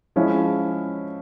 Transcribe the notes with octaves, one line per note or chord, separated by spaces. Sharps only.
F3 G#3 C#4 E4